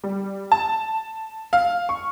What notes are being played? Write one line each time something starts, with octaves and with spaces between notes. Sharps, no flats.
G3
A5
F5
C#6